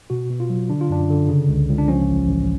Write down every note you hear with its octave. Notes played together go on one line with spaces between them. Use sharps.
B2 F#4
B2
F4
F#3
D3 D4
F4
F#2 D4
D3
C#3
C#2
C#2
D4
F3 C#4
A1
A1